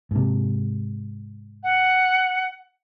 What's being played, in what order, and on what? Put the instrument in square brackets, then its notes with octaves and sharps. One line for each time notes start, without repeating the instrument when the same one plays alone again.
[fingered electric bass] G#2 C3
[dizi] F#5